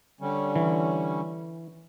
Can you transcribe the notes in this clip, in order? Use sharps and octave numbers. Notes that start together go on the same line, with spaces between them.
D3 G3 C#4
E3